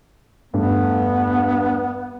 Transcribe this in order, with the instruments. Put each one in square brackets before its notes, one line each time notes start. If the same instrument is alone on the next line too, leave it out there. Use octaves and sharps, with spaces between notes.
[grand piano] E2 G2 A3 [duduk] B3